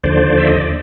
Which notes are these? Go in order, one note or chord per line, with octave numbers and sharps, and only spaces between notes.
D#2 D3 F3 C5 D5
E5
D#5
D5